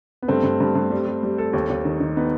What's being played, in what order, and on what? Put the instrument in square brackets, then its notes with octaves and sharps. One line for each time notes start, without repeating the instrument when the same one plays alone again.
[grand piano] B3
[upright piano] G2 [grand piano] A3 C4
[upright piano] G2
G2
G2
G3
G3
G3
A4
D#2
D#2
D#3
D#3
[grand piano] B3 D#4